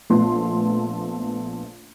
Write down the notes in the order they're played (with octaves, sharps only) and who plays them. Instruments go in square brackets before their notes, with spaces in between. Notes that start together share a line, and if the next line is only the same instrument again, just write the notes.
[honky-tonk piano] A#1 A3 B3 C6